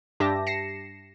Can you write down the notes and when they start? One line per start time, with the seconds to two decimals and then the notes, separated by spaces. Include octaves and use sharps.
0.20 G2 D4 G4 E5 A5 A#6
0.47 A#6 C7 C#7 E7